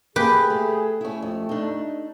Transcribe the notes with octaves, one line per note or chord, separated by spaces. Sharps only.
A#3 G4 G#4 B4
A3
A3 C#4 E4
F2
D4 D#4